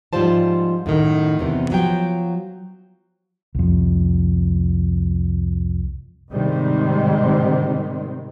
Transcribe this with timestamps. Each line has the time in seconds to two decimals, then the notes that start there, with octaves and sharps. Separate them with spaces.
0.13 G#2 F3 G3 F4 C5 A5
0.86 F#2 A2 D#3
1.39 E2 C3 E3
1.70 F3 F#3 G5
3.55 C2 F2
6.31 G#2 C3 D#3 G3 C4